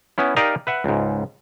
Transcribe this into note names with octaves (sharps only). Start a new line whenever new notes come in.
B3 C#4 E4
D#4 G4 A#4 D5 D#5 F5
B4 E5 F#5
C#2 G#2